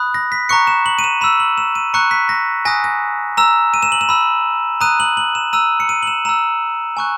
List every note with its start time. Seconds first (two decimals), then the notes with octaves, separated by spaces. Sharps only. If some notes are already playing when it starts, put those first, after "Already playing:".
Already playing: B5 D#6 F#6
0.14 A#6
0.32 B6
0.49 A#5 C#6 F#6 C#7
0.67 E7
0.86 F#7
0.99 D#7
1.04 E7
1.21 B5 E6 E7
1.40 F#7
1.58 E7
1.75 D#7
1.94 A#5 C#6 F#6 C#7
2.11 B6
2.29 A#6
2.65 G#5 D#6 F#6 A#6
2.84 A#6
3.37 A#5 E6 E7
3.74 D#7
3.83 E7
3.92 F#7
4.01 E7
4.09 B5 E6
4.81 A#5 D#6 F#6 D#7
5.00 F#7
5.17 F#7
5.35 E7
5.53 A#5 E6 D#7
5.80 C#7
5.89 D#7
6.03 F#7
6.07 E7
6.25 A#5 E6 E7
6.97 G#5 C#6 F#6